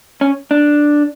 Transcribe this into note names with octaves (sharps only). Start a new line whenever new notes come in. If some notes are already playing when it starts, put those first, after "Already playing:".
C#4
D4